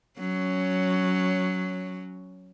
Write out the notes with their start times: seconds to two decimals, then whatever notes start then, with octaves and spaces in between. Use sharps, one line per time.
0.19 F#3 C#4